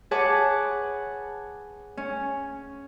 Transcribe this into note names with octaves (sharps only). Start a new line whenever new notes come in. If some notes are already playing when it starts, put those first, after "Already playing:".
G#4 B4 C#5 F#5 A5 D6
C#4